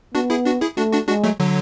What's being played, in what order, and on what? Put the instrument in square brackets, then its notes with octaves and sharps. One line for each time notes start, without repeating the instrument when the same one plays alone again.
[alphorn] B3 [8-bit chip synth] D4 F#4
[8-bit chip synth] E4 G#4
D4 F#4
E4 G#4
[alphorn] A3 [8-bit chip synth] D4 F#4
[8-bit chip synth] D4 F#4
[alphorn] G#3 [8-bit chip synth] D4 F#4
[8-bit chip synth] F#3 A3
D3 F#3